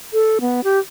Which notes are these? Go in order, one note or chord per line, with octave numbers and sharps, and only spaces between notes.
A4
B3
G4